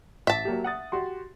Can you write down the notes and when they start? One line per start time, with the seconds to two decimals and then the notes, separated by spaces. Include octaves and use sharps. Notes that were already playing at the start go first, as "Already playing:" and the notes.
0.27 A1 E5 A5
0.45 F#3 A#3 G4
0.64 F#5 D#6 A6
0.92 F#4 G4 C6